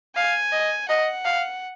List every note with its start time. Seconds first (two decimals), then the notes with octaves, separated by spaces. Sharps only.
0.16 F5 G#5
0.52 D#5
0.89 D#5 F#5
1.25 F5